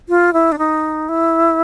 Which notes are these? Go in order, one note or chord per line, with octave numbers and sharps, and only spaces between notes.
F4
E4
D4
D#4
E4